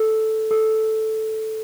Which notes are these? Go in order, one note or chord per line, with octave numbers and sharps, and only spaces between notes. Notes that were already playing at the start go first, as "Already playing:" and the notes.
Already playing: A4
A4